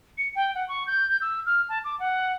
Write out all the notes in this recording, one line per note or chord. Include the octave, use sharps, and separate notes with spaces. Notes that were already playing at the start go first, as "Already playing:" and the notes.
C#7
G5
F#5
C#6
G6
G6
E6
F6
A5
D6
F#5